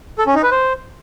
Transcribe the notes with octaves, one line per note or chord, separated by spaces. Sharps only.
A4
C#4
D#4
B4
C5